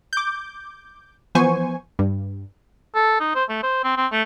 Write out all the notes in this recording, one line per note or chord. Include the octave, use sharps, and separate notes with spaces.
D6 G6
E3 F3 B3 C5 G#5 C#6
G2
A4
D#4
C5
A3
C5
C4
C4
A3